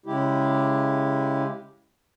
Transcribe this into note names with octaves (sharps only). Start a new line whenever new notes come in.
C#3 G#3 E4 G4